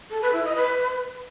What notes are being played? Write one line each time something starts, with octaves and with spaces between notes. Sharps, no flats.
A4
B4
E4
D#5
B4